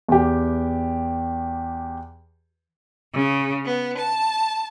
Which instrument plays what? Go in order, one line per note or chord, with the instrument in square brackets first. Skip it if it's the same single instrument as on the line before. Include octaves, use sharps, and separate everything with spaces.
[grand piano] E2 G4
[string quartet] C#3
B3
A5